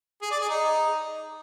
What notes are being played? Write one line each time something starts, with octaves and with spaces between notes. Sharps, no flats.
G#4
D5
G#4
D#4